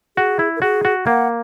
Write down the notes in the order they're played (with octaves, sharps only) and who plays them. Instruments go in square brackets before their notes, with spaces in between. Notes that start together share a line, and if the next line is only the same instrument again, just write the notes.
[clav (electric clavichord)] F#4 [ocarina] G#4
[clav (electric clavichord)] E4
[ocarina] A#4
[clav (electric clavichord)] F#4 [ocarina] G#4
[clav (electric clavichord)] F#4
[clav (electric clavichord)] A#3 [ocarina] F#5